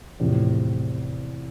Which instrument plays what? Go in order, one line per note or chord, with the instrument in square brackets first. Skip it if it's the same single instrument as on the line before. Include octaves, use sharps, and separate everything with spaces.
[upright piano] E2 C3 F3 [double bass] A2